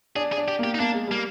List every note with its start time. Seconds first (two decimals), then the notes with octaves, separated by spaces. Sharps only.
0.16 D4 G#4
0.32 G#4
0.38 D4
0.48 G4
0.59 A#3 G4
0.75 D#4
0.80 A#3 D4
0.94 G#3
1.08 G3 A#3